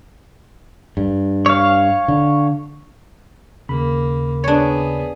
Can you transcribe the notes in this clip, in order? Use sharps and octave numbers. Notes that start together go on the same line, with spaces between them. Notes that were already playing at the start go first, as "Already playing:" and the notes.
G2
C#5 F5
D3
D#2 C#3 A#3 B5
B3 D4 G#4 C#5